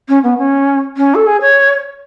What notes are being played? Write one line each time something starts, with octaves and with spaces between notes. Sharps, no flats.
C#4
B3
C#4
C#4
A4
G#4
C#5